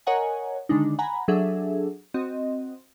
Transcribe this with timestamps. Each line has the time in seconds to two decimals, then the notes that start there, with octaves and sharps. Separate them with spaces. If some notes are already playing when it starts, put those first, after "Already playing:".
0.06 A#4 C#5 D#5 F#5 G#5 A#5
0.69 D3 D#3 G#3 D4 D#4
0.99 F#5 G#5 A#5 B5
1.28 F#3 D4 G#4 A4 E5
2.14 C4 F#4 D#5